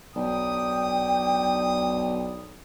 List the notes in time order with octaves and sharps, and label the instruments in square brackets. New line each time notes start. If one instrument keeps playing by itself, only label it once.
[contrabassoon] B1 [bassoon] D4 [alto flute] G5 [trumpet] D#6